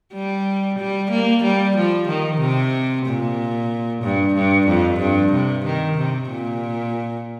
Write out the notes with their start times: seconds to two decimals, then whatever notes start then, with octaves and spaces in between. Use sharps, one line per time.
0.14 G3
0.78 G3
1.10 A#3
1.43 G3
1.76 F3
2.08 D#3
2.41 C3
3.06 A#2
4.03 G2
4.35 G2
4.68 F2
5.00 G2
5.32 C3
5.65 D#3
5.97 C3
6.30 A#2